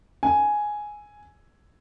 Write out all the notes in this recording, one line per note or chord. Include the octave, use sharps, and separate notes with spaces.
G#5